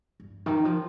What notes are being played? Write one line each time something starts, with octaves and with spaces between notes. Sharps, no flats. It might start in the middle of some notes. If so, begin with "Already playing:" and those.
G2
D#3
F3